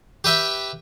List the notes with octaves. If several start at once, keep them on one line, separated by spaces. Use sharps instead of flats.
G4 B4 E5 G5